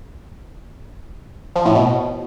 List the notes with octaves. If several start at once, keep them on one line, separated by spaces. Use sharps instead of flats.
F3
A2
B2